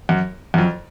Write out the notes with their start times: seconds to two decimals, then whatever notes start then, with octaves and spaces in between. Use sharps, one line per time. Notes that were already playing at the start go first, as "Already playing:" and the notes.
0.09 F#2
0.54 F#2
0.58 F2